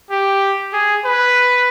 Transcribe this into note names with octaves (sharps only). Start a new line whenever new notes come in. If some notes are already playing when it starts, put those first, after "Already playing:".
G4
G#4
B4